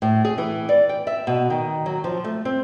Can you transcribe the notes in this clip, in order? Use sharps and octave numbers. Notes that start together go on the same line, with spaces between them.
A2
G#4
E3
D5
G5
E5
B2
D#3
F#3
F3
A3
C4